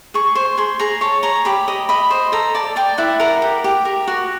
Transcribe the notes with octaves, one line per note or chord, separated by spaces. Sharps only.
G#4 C#6
C5
G#4 C6
G#4 A#5
C#5 A5
G#4 A#5
G4 B5
D#5
D#5 B5
C5
A4 A#5
D5 A5
D5 G5
E4 F#5
A#4 F#5
G4
G4
A#4
F#4